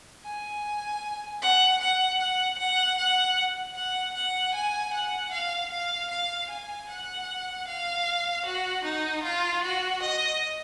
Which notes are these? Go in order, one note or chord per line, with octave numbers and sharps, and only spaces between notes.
G#5
F#5
F#5
F#5
F#5
F#5
F#5
F#5
G#5
F#5
F5
F5
F5
G#5
F#5
F5
F#4
D#4
F4
F#4
D#5